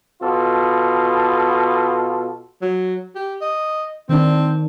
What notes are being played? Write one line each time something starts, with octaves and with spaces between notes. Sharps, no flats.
B2 F4 A4
F#3
G4
D#5
D#3 C4 D4